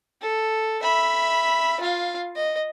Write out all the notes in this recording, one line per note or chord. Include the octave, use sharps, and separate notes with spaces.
A4
E5 B5
F4 F5
D#5